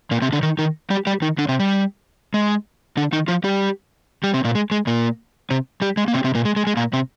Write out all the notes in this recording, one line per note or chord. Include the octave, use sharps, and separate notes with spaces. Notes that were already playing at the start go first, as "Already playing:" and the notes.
A#2 A#3
C3 C4
D3 D4
D#3 D#4
D#3 D#4
G3 G4
G3 G4
D#3 D#4
D3 D4
C3 C4
G3
G#3
D3 D4
D#3 D#4
F3 F4
G3 G4
G3 G4
C3 C4
A#2 A#3
G#3
G#3
A#2 A#3
C3 C4
G3 G4
G#3
A#3
C3 C4
C3 C4
A#2 A#3
G#3
G#3
G#3
A#2 A#3
C3 C4